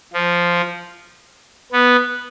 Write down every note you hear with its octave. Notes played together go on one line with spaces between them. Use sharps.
F3
B3